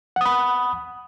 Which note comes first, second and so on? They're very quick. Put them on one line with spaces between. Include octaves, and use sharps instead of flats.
F#5 D#6 B5